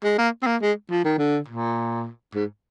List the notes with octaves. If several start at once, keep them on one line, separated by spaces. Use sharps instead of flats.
G#3
A#3
C4
A#3
G#3
F3
D#3
D3
A#2
G#2